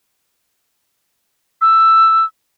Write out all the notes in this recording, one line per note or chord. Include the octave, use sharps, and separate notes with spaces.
E6